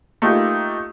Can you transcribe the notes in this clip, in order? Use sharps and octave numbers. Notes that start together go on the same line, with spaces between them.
A3 A#3 D#4 F4 G4